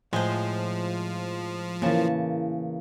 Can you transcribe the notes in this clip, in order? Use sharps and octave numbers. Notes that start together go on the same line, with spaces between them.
A2 F3 G#3 C5
C#3 E3 A#3 A5